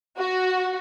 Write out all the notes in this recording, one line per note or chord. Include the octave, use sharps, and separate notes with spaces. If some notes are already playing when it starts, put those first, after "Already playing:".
F#4